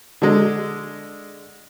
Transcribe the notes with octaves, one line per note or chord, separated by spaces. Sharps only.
D3 G#3